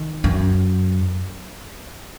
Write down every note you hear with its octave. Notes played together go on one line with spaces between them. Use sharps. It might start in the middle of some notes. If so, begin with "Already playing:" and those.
Already playing: D#3
F#2